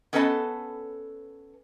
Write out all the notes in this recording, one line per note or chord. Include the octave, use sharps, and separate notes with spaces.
B3 C#4 A4 B4 D#5 A5